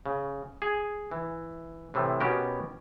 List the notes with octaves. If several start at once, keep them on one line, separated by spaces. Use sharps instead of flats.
C#3
G#4
E3
A2 C3 E3 A3
B2 B3 C#4 F#4 G4 A#4